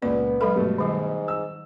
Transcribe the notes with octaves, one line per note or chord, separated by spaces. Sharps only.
C#2 A#2 B3 D5
F#3 G#3 A4 B5
G2 B2 A3
G#2 D#3 G3
E6